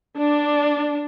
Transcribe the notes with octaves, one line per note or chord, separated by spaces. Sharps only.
D4